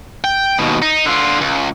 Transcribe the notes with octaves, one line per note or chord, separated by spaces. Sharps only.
G5
D#2 B2
D#4
D3 F4
C#2